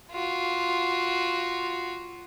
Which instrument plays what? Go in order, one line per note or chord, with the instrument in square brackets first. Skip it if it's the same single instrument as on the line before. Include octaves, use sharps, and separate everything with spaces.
[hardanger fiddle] F4 F#4